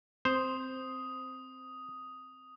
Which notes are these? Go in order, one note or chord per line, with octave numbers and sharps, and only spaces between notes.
C4 C5 D#6